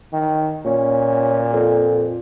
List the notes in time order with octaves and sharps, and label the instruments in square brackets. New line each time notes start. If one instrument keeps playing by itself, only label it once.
[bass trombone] D#3
[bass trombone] A#2 [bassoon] C#4
[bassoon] F2